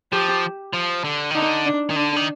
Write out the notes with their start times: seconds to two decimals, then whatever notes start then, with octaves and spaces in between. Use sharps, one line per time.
0.12 F3 G4
0.73 F3
1.04 D3
1.30 D#3
1.35 D3 D#4
1.66 D4
1.90 D#3
1.96 D3 D4
2.16 D#3